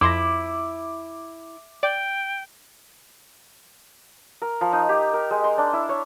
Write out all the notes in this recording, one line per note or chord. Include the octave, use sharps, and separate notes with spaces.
F2 E4 C6 D6 A#6
D5 G5
A#4
F3
D#4
G4
A#4
G#3
C6
D4
E4
C#5